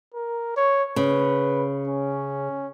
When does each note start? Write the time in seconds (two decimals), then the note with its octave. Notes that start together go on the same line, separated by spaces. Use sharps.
0.14 A#4
0.56 C#5
0.96 C#3 B4
1.87 C#4